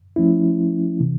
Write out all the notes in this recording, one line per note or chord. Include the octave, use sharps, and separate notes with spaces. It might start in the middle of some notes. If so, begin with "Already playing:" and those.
F3 A3 C#4 E4
C3 E3